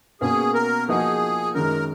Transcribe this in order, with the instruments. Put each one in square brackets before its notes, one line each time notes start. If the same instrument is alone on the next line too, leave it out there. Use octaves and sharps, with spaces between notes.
[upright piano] B2 A#3 C#4 [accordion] G#4
[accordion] A#4
[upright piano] F3 A#3 D#4 F#4 [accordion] G#4
[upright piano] F#2 D#3 G#3 [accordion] A#4